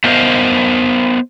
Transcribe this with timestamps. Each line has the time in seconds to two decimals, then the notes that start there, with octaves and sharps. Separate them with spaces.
0.04 A3 B3 A#4 C5 D#5 F5